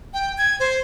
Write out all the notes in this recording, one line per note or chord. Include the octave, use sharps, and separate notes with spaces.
G5
G#6
C5